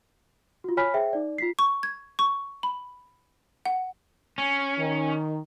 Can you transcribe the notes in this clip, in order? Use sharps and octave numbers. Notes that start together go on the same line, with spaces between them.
F4 F#4
C#5 G#5 B5 F6 B6
G#4 C5 E5 G5
D#4 D5
F4 B6 C7
C#6
G#6
C#6
B5
F#5
C#4
D#3